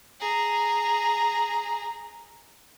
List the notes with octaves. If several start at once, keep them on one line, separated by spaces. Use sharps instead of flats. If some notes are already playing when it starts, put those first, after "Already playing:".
G#4 A#5